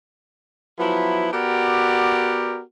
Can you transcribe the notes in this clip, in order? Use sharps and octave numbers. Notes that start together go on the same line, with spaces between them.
F3 F#3 B3 E4
B3 F#4 G4 A#4 D5